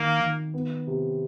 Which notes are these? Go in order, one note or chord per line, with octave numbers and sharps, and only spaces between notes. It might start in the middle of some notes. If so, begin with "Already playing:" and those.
Already playing: D#3 A#3
D#3
B3
C3